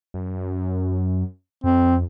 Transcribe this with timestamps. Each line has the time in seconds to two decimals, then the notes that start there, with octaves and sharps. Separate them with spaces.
0.14 F#2
1.64 F2 C4